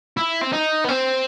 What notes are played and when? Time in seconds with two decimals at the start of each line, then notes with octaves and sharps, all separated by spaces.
0.17 E4
0.41 C4
0.52 D#4
0.84 B3
0.88 C4